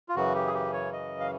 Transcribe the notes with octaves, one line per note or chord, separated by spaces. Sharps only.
F4
F#2 C#3 E3 F#4
G4
G#4
G4
C#5
D#5
F5